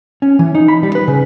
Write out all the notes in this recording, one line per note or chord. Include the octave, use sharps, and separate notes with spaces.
C#4
E3
D#4
B5
G3
B4
C#3